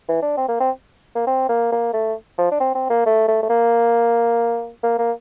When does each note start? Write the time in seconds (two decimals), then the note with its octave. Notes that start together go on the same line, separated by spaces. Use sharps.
0.08 E3
0.22 D4
0.37 C4
0.48 A#3
0.60 C4
1.15 A#3
1.27 C4
1.49 A#3
1.72 A#3
1.93 A3
2.38 F3
2.51 D4
2.60 C4
2.75 C4
2.90 A#3
3.06 A3
3.28 A3
3.42 A3
3.49 A#3
4.83 A#3
4.98 A#3